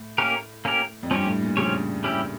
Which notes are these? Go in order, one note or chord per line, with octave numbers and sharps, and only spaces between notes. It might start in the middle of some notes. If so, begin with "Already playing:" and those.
Already playing: A2
A#3 C#4 G4 A#4
A#3 C#4 G4 A#4
F2
G2 F3 C#4 G4 C#5
A2
A#2
C#3 F3 C#4 G4 C#5
G3 C#4 E4 G4